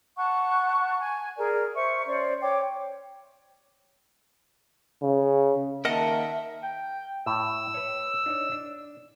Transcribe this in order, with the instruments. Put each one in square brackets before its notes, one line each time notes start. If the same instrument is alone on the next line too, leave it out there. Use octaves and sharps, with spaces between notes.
[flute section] F#5 A5 C#6 F#6
G#5
G#4 A#4 D5
C5 E5 C#6
C#4 C5 D5
C#5 G5 D6
[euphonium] C#3
[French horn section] D#3 A#3 [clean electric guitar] A#4 D#5 F#5 [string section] E5 [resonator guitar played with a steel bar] A5
[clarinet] G5
[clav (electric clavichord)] A2 [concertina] E6
[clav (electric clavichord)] B4 C#5
D4 D#4 C#5
D4